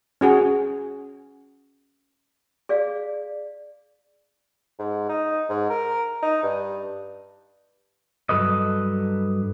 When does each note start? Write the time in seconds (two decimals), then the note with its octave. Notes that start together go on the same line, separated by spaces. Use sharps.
0.21 C#4 F#4 G#4
2.69 G#4 D5 F5
4.79 G#2
5.09 D#4
5.50 G#2
5.70 A#4
6.23 D#4
6.43 G2
8.29 G2 F#3 A4 B4 D#5